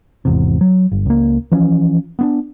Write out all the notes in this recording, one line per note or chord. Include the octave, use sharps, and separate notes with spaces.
G#1 E2 C3
F#3
G1
C#2 A#3
E3 F3 C#4
B3 C4 D4